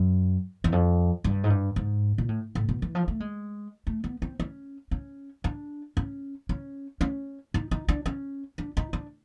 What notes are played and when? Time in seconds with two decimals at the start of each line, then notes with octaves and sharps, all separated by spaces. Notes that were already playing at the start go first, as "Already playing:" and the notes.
Already playing: F#2
0.64 E2
0.72 F2
1.24 G2
1.44 G#2
1.50 G2
1.76 G#2
2.18 A#2
2.29 A2
2.55 A2
2.69 B2
2.82 E3
2.95 F3
3.08 A3
3.20 G#3
3.87 A3
4.04 B3
4.22 C4
4.40 C#4
4.91 C#4
5.44 D4
5.97 C#4
6.49 C#4
7.01 C#4
7.54 D#4
7.71 D#4
7.88 D4
8.06 C#4
8.58 D4
8.77 D#4
8.93 D4